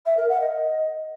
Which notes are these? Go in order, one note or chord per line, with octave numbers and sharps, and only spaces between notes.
E5
A#4
F#5
D#5